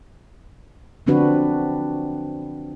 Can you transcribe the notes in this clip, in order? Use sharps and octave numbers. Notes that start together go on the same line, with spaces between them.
D3 F3 C4 D4 F#4 B4